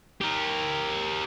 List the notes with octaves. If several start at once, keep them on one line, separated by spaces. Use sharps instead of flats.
G4 A#4